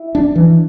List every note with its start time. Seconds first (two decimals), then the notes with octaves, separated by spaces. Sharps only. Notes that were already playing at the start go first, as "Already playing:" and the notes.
Already playing: E4
0.15 D4
0.36 E3